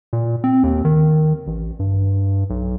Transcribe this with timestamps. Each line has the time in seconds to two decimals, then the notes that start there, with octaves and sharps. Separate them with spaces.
0.13 A#2
0.44 C4
0.63 D#2
0.85 D#3
1.47 A1
1.79 G2
2.50 B1